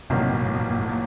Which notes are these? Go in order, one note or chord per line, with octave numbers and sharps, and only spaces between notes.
A1 G2 C3 D#3 F#3 A#3
C3
B2
A2
B2
A#2
A#2
A2
A#2